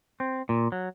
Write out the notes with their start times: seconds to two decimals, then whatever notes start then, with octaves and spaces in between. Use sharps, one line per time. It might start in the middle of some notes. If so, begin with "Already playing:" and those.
0.20 C4
0.49 A#2
0.72 F#3